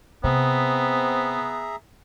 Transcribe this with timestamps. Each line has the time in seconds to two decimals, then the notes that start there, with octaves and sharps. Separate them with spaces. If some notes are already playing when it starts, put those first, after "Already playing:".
0.24 C3 B3 C4 G#4 E5 A#5